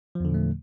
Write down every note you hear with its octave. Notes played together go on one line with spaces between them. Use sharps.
E2 A#2 D3 F3 A3